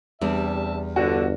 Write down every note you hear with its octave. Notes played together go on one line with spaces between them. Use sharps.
E2 C3 G3 D4 E5 A5
G1 D3 F#4